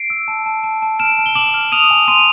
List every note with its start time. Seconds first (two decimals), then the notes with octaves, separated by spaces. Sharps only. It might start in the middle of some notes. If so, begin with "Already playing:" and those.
Already playing: C7 D7
0.10 E6
0.28 A5
0.46 A5
0.63 A5
0.82 A5
0.99 F6 D7 E7
1.18 A5
1.26 G7
1.35 D6 E7 F#7
1.54 F6
1.72 D#6 D#7 F7
1.91 G#5
2.08 C6 D#7 F7